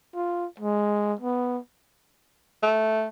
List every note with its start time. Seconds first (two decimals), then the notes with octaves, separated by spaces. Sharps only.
0.15 F4
0.60 G#3
1.21 B3
2.63 A3